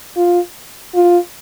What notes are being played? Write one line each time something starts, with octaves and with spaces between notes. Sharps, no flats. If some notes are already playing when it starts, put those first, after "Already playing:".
F4
F4